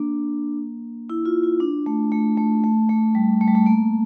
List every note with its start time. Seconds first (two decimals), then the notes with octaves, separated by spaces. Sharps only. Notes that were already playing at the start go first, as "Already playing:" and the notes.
Already playing: A#3 D4
1.10 E4
1.26 F4
1.43 F4
1.60 D4
1.86 A3
2.12 A3
2.38 A3
2.64 A3
2.89 A3
3.15 G3
3.41 A3
3.48 G3
3.55 A3
3.67 A#3